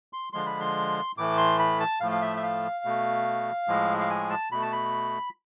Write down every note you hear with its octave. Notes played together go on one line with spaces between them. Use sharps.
C6
D3 F3 G#3 C6
B5
C6
A2 E3 A3 D6
C6
B5
A5
A2 F3 A3 F5
F5
E5
E5
F5
B2 A3
A2 F3 G#3
F5
G#5
A5
B2 A3 B5
A5
B5